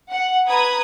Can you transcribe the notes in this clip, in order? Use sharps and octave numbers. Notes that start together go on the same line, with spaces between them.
F#5
B4 A#5 B5 D#6 G#6